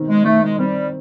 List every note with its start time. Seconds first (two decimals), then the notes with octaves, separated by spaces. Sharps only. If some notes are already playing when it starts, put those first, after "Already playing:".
Already playing: B2 D#3 C4
0.09 G#3
0.25 D#3 A3
0.43 G#3
0.59 G3 C4